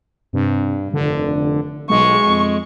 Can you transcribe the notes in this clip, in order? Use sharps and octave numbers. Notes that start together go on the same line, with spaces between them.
G2 C3
F1 D3
B1 G#3 C#6
F2